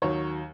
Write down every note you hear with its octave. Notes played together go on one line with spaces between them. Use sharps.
D#2 D#3 F#3 C#5